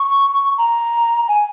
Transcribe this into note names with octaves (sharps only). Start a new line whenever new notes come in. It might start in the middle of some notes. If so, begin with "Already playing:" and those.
Already playing: C#6
A#5
G#5